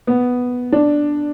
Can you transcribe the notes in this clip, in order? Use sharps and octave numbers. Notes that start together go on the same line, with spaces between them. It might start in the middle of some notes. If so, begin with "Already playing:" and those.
B3
D4